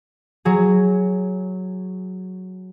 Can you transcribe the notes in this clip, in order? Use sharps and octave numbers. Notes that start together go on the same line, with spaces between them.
F#3 G#4